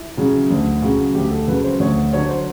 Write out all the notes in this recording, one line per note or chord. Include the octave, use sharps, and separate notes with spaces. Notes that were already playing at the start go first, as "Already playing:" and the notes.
Already playing: E4
C#3 F#3
D2
C#3 F#3
D2 G4
A4
C#3 F#3 B4
C5
D2 C#5
D3 F#3 C#5
C5